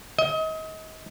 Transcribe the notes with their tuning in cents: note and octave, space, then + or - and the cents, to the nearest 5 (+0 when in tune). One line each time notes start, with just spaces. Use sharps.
D#5 +35